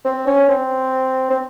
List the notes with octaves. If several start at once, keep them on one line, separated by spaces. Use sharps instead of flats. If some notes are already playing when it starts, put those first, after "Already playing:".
C4
C#4
C4
C4